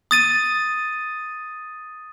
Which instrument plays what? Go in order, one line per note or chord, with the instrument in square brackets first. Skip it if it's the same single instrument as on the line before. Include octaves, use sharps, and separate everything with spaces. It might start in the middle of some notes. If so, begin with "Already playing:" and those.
[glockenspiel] D#6 A6 D#7